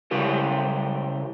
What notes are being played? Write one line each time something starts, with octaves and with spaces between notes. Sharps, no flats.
C#3 E4 G4 A#4